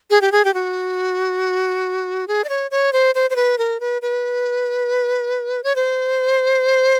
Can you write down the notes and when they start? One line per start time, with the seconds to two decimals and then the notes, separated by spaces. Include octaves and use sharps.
0.10 G#4
0.21 G4
0.32 G#4
0.45 G4
0.54 F#4
2.28 G#4
2.44 D5
2.49 C#5
2.71 C#5
2.93 C5
3.15 C5
3.30 C5
3.36 B4
3.58 A#4
3.80 B4
4.02 B4
5.64 C#5
5.76 C5